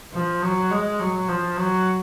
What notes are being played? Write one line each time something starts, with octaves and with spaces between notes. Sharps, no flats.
F3
F#3
G#3
F#3
F3
F#3